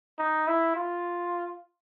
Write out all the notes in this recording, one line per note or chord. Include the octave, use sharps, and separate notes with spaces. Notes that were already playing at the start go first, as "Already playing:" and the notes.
D#4
E4
F4